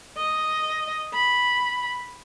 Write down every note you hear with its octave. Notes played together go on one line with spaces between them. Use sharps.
D#5
B5